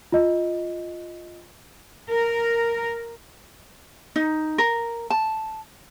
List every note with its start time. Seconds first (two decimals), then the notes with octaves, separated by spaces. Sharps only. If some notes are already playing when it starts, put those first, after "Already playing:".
0.12 F4 D#5
2.10 A#4
4.16 D#4
4.58 A#4
5.10 A5